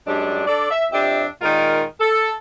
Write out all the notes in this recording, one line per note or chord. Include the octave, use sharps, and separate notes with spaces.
F#2 G3 G#3 D4
D4 A4 D5
E5
F2 D4 G4 E5
A#2 D#3 G#3 F4 A#4
A4